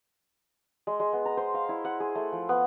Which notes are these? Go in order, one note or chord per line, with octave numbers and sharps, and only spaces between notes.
G#3
G#3
B3
A#5
C5
F5
E4
F#5
G#4
A3
F3
B3